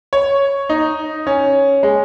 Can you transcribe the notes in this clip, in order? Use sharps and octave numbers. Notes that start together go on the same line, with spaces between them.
C#5
D#4
C#4
G#3